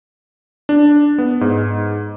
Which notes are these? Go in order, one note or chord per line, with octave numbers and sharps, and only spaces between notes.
D4
B3
G#2